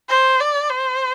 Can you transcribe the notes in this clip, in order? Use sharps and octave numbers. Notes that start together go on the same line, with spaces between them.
C5
D5
C5